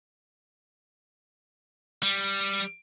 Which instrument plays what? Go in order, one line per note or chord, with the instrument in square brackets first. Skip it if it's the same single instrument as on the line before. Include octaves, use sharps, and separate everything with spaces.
[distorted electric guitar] G3